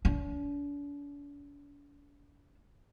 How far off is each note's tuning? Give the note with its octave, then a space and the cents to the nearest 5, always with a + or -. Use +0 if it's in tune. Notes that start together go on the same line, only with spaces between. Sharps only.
D4 -45